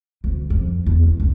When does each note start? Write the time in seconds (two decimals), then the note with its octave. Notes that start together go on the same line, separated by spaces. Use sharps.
0.24 D2
0.50 F2
0.86 E2
1.03 A3
1.20 C2